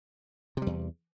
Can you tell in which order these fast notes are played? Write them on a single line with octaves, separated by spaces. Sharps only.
C3 G3 E2